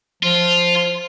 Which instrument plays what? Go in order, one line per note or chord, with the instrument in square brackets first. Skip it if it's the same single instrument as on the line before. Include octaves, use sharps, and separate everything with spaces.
[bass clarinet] F3 [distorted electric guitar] F4